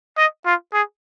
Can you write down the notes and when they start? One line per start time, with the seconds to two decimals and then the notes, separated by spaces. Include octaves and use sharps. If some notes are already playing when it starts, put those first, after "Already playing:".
0.17 D#5
0.46 F4
0.73 G#4